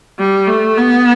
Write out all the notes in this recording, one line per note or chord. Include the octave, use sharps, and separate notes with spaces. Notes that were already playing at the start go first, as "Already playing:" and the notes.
G3
A3
B3